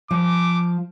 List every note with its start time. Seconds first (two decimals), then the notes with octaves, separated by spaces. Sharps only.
0.11 F3 D6